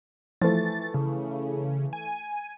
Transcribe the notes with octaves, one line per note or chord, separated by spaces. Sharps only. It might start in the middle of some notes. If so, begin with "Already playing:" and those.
E3 F3 A3 A6
C#3
G#5